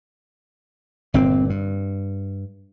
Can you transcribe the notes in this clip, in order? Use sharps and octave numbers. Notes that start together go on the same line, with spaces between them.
G1 A#2 C4
G2